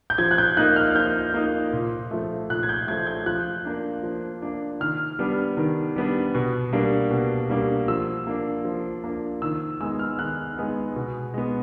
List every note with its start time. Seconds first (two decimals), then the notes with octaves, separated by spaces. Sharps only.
0.10 G6
0.18 F3 G#6
0.31 F#6
0.38 G6
0.57 A#3 D#4 F#6
0.76 F6
0.95 F3 G6
1.34 A#3 D#4
1.73 A#2
2.11 F3 A3
2.50 A#2 F#6
2.63 G#6
2.69 G6
2.88 F3 A3 G#6
3.07 G6
3.26 F3 F#6
3.65 A#3 D4
4.03 F3
4.42 A#3 D4
4.80 D#3 F6
5.19 G3 B3 D4
5.57 D#3
5.96 G3 B3 D4
6.35 B2
6.73 G3 A#3 D4
7.11 B2
7.50 G3 A#3 D4
7.88 F3 E6
8.27 A#3 D4
8.65 F3
9.04 A#3 D4
9.42 D#3 E6
9.80 G#3 B3 D#4 E6
9.99 F6
10.19 D#3 F#6
10.57 G#3 B3 D#4
10.96 B2
11.34 G#3 B3